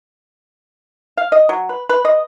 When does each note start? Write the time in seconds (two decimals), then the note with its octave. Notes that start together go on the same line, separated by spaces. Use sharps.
1.17 F5
1.32 D#5
1.49 F#3
1.69 B4
1.89 B4
2.05 D#5